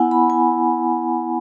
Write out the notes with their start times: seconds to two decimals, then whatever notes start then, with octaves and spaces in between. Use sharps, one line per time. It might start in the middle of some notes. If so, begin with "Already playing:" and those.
Already playing: B3 E4 F#5 G#5
0.11 B5
0.30 G#5